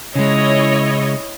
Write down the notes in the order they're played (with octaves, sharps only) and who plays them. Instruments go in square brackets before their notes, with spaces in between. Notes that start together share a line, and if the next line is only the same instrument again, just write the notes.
[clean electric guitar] C#3 G#3 [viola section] E4 C#5 D#5